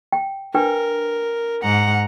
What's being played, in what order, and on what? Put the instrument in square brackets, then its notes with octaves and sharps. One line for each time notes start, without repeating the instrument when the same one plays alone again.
[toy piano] G5
[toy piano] D4 B4 G5 [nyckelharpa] A#4
[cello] G#2 F#5 [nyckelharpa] A#5